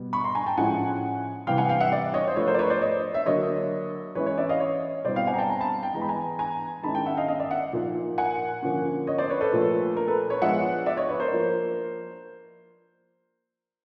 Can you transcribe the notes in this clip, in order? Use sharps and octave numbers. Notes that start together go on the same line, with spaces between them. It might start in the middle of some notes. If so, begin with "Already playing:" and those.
Already playing: B2 G3 B3
B5 C#6
A#5 C6
G#5 A#5
G5 A5
A2 F3 G#3 C#4 E4 F#5 G#5
C3 E3 G3 F5 G5
F#5 G#5
F5 G5
E5 F#5
D5 E5
C#5 D#5
C5
F3 A3 D4 B4 C#5
A#4 C5
D5
B4 C#5
C5 D5
C#5 D#5
E5
D3 F#3 A#3 D4 C#5 D#5
E3 G#3 C#4 E4 B4 C#5
B4 C#5
D5 E5
D#5 F5
C#5 D#5
B2 G3 C4 E4 C5 D5
F5 G5
F#5 G#5
A#5
G5 A5
G#5 A#5
A5 B5
G5 A5
E3 G#3 B3 A#5
B5
G#5 A#5
G#5 A#5
D#3 G#3 C#4 E4 A5 B5
G5 A5
E5 F#5
D#5 F5
D#5 F5
D5 E5
E5 F#5
A#2 F3 A#3 D#4
F#5 G#5
D3 F3 A#3 C#4
C#5 D#5
C5 D5
B4 C#5
A4 B4
A#2 F3 A3 D4
A#4
A4 B4
B4 C#5
F3 G#3 B3 D4 E5 F#5
D5 E5
C#5 D#5
B4 C#5
A#4 C5
F3 A#3 D4